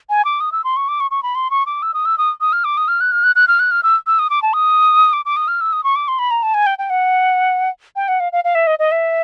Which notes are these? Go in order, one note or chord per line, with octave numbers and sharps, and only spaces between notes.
G#5
D6
D#6
E6
C6
C#6
D6
C#6
C#6
B5
C6
C#6
D6
E6
D#6
E6
D#6
D#6
F6
D6
D#6
F6
F#6
F6
F#6
F#6
F6
F#6
F6
E6
E6
D#6
D6
A5
D#6
D6
D6
D#6
F6
E6
D#6
C#6
D6
C6
B5
A#5
A5
G#5
G5
G5
F#5
G5
F#5
F5
F5
F5
E5
D#5
D#5
E5